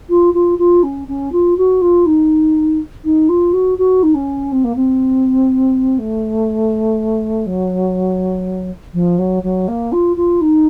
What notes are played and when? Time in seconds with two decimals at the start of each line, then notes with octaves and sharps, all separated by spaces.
0.09 F4
0.34 F4
0.58 F4
0.83 C#4
1.07 C#4
1.32 F4
1.57 F#4
1.81 F4
2.06 D#4
3.04 D#4
3.29 F4
3.53 F#4
3.78 F#4
4.03 D#4
4.14 C#4
4.52 C4
4.64 A#3
4.75 C4
5.98 A3
7.46 F#3
8.94 F3
9.18 F#3
9.43 F#3
9.68 A#3
9.92 F4
10.16 F4
10.41 D#4